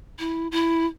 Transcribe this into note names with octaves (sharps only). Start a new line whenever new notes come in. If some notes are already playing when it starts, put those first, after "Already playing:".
E4
E4